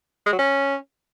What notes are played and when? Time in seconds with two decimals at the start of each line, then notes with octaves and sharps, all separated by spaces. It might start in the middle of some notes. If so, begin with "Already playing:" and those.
0.26 G#3
0.33 F#3
0.39 C#4